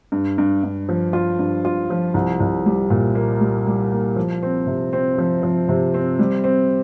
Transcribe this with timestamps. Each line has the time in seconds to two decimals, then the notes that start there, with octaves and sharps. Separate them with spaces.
0.12 G2
0.38 G2
0.64 G2
0.89 F3
1.13 F4
1.39 G2
1.65 F4
1.90 F3
2.14 C2
2.40 C2
2.66 G3
2.90 A#2
3.15 A#3
3.41 G3
3.67 G3
3.92 A#3
4.16 F3
4.43 C4
4.67 C3
4.93 C4
5.18 F3
5.43 F3
5.69 C3
5.94 C4
6.19 G3
6.44 C4